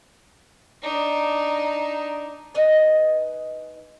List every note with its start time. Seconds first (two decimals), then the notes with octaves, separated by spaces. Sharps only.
0.82 D4 D#4
2.54 D#4 B4 D#5 G#5